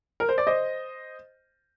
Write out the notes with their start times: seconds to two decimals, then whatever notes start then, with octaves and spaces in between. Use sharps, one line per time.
0.20 A#4
0.29 C5
0.38 D5
0.47 C5 D#5